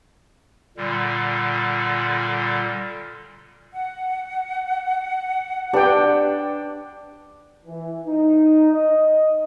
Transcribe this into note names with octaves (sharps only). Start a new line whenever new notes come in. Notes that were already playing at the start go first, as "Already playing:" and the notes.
A#2 D3 G3
F#5
D4 G4 B4 G5
E3
D#4
D#5